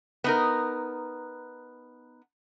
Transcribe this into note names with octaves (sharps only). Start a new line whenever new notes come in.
B3 D#4 A#4